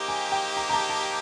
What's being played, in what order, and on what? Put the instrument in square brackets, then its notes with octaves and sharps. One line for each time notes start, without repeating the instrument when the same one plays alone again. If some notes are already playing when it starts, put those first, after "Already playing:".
Already playing: [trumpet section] A#3 D#4 G4 C5 [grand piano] A#5
[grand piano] G#5
G5
A#5
A#5
A5
A5